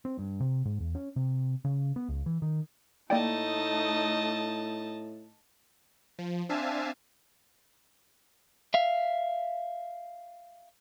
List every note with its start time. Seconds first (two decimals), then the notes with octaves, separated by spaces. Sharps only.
0.05 C4
0.19 G2
0.40 C3
0.65 G#2
0.80 E2
0.95 C#4
1.16 C3
1.65 C#3
1.96 B3
2.09 C#2
2.26 E3
2.42 D#3
3.10 A2 A3 A#3 D#4 D5 D#5 G5 A5
6.19 F3
6.49 C4 D4 E5 F5 G#5 A5
8.74 E5 F5